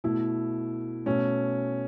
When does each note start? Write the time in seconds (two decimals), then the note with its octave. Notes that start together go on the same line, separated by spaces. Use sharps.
0.04 B2 A3 E4
1.06 B2 A3 C#4